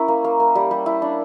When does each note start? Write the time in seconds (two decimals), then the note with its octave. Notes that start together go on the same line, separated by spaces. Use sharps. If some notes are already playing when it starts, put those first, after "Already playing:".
Already playing: C#4 E4 A#4
0.08 A#3
0.24 A#3
0.40 A#3
0.55 G3
0.71 G3
0.86 E4
1.02 D4